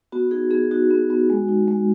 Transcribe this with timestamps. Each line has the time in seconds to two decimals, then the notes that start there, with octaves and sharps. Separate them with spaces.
0.12 B3 F#4
0.31 D#4 G#4
0.51 B3 G#4
0.71 D#4 F#4
0.91 B3
1.10 B3
1.30 G#3
1.49 D#4
1.68 G#3